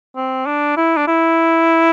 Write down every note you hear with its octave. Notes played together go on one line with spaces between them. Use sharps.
C4
D4
E4
D4
E4